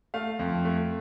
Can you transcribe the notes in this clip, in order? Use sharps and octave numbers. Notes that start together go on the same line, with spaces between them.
A3 F5
F2
A3